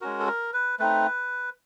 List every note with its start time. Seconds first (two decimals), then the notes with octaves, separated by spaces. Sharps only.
0.01 G#3 C#4 F#4 A#4
0.20 A4
0.27 A#4
0.53 B4
0.79 A3 C4 D#4 B4